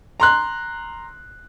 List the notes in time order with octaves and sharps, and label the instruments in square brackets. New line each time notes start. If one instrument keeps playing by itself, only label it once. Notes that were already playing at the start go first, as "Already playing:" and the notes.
[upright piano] A#5 C6 F#6